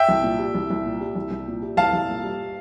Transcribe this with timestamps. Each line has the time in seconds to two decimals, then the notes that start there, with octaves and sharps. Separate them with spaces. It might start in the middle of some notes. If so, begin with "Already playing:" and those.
Already playing: E5 G5
0.09 C2
0.23 A#2
0.39 G3
0.55 C2
0.70 C2
0.85 A#2
1.01 G3
1.15 C2
1.31 C2
1.47 A#2
1.62 G3
1.77 C2 F5 A5
1.93 C2
2.09 A#2
2.23 G3